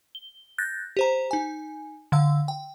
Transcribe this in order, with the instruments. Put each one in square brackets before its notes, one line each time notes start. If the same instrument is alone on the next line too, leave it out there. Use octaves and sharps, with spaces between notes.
[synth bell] G7
F#6 G6 A6 A#6
G4 C5 A#5
D#4 G#5
D3 F5 E6
G5